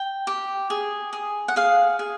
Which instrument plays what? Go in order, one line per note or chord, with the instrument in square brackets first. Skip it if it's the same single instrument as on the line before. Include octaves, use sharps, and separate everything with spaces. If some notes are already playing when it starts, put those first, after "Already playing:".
Already playing: [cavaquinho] G5
G4
G#4
G#4
F#5
G#4 F5
G#4